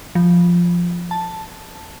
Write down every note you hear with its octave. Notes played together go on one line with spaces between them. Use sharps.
F3
A5